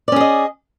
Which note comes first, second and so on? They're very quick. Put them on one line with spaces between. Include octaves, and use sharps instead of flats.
D5 C#4 G#4 D#5